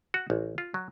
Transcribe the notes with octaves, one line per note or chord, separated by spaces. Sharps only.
F#4
A1
F4
F#3